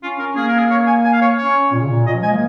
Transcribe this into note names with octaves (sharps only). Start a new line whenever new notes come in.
C#4 F4
C#4 A#4
A#3 G#4
A#4
G#4
C#5
G#5
G#5
F5
C#5
C#4 C#5
A#2
C#3
A#2
A#2 D#5
F3
G#3 G#5
A#3